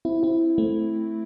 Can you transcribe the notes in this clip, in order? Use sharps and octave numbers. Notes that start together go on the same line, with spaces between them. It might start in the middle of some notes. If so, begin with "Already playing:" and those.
C4 E4
C4 E4
A3 C4